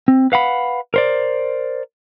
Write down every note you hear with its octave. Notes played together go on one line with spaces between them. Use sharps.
C4
B4 F5 F#5 B5
A#4 C5 D5